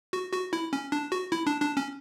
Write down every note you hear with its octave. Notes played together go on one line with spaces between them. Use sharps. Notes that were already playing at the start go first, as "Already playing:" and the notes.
F#4
F#4
E4
C#4
D4
F#4
E4
D4
D4
C#4